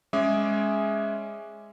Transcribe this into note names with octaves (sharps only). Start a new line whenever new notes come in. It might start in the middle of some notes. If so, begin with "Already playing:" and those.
G#3 C#4 G#4 E5 D6